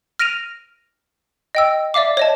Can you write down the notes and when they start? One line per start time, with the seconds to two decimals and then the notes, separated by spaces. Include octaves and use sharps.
0.19 F6 A#6 D7 D#7 F7
1.55 D#5 G5 E6
1.94 D5 E5 F5 D6
2.17 C#5 D#5 A5